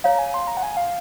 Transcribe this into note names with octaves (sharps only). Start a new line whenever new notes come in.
C#5 F5 A#5
G#5
C6
A#5
F#5
G#5
F5